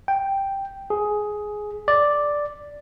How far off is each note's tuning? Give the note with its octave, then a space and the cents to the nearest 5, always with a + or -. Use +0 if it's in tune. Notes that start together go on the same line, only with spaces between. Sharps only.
G5 +0
G#4 +10
D5 +0